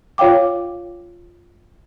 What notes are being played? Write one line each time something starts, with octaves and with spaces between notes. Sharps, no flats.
F4 C#5 F5 G5 D6